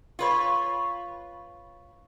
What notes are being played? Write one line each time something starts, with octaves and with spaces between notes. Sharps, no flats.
F4 B4 C#5